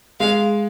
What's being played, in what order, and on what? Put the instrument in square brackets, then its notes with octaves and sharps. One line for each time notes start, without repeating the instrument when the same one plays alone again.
[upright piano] G#3 [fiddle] F5